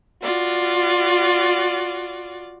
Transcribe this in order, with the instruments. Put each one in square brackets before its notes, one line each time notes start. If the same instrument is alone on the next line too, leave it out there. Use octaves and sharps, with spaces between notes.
[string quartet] F4 F#4 D5